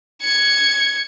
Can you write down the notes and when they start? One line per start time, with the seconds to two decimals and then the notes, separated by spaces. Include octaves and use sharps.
0.22 G#6 C#7